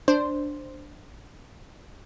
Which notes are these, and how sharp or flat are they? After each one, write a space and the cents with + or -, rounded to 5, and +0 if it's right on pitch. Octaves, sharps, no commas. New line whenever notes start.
D4 +0 C5 +0